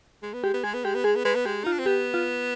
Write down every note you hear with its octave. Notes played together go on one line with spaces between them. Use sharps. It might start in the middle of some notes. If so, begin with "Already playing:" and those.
G#3
B3
G#3 G4
B3
G#3 G#4
B3
G#3 G4
B3
G#3 G#4
B3
G#3 B4
B3
G#3 G4
D#4 F4
D4
C4
B3 G4
F4